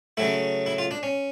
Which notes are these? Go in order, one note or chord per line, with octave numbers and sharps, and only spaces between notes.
C#3 F#3 A3 E4
E4
F4
D4
C#4